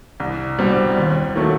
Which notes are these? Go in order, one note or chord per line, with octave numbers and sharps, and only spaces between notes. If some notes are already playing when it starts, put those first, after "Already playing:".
C2
B2 G3 C4
D#2
D#3 F#3 A3